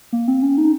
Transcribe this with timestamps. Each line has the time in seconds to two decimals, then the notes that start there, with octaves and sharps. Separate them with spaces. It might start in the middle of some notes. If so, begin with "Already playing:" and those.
0.13 A#3
0.28 C4
0.42 C#4
0.57 D#4